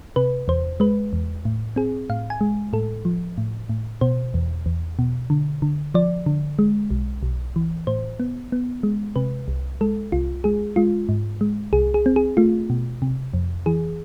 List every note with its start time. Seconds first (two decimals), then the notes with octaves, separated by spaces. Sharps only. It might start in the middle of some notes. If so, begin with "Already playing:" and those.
0.16 C3 B4
0.48 E2 C5
0.80 G#3 B4
1.13 E2
1.45 A2
1.76 C4 G#4
2.10 A2 F5
2.30 G#5
2.41 G#3
2.73 A2 A4
3.05 F3
3.38 A2
3.69 A2
4.01 B2 C5
4.34 E2
4.66 E2
4.99 B2
5.30 D3
5.62 D3
5.94 F3 D5
6.26 D3
6.59 G#3
6.91 B1
7.23 B1
7.56 E3
7.87 A2 C5
8.20 B3
8.52 B3
8.83 G#3
9.16 C3 B4
9.48 C2
9.81 G#3 A4
10.12 C2 F4
10.44 G#3 G#4
10.76 G#3 F4
11.09 G#2
11.41 G#3
11.73 C2 G#4
11.94 G#4
12.06 C4
12.16 G#4
12.37 A3 F4
12.70 B2
13.02 C3
13.34 F2
13.66 E3 G#4